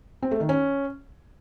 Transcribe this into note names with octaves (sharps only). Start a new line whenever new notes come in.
C4
A3
D#3
C#4